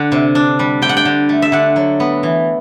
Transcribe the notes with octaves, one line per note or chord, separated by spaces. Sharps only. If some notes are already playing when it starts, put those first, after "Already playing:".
Already playing: D3 F#5
C3
D4
G3
D3 G5
F#5
G5
D3
A3
E5
D3 F#5
F#3
B3
E3